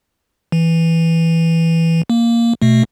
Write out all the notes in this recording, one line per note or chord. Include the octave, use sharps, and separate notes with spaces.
E3
A#3
B2 A3